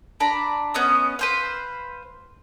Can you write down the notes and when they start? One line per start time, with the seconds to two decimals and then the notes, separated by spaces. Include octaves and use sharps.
0.20 D4 A#5 B5
0.74 B3 C#4 D#5
1.19 B4 C5 F5